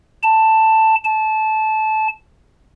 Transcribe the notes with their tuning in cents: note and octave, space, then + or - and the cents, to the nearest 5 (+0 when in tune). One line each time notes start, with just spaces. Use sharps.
A5 +5
A5 -20